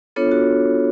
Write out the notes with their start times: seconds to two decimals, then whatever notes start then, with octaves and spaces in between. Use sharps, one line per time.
0.16 B3 D4 F4 A4 C#5
0.32 F#4